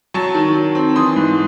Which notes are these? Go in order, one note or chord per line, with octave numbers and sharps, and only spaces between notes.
F#3 A5 C#6
D#3
F#3
C4
E3 C6 D#6
G#2